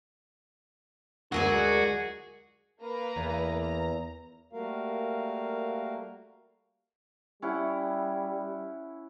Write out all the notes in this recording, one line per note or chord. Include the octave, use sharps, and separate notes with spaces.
D2 F#3 G#3 F#4 G#4 A#4 D5
A#3 B4 A#5
E2
A#5
G3 A3 A#3 F#4 A#4 F5
G3 C#4 E4 F#5